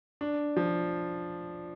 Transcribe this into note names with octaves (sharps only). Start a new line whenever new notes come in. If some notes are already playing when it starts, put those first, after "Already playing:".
D4
F3